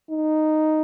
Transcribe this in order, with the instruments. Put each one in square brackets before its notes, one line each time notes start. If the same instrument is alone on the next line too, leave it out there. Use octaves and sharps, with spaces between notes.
[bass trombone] D#4